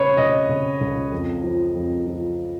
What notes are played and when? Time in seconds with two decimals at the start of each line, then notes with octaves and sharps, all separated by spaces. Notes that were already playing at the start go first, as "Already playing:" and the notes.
Already playing: C#3 B4 C#5
0.17 C#3 D#5
0.49 C#3
0.81 C#2
1.12 F2
1.44 F3
1.75 F2
2.07 F3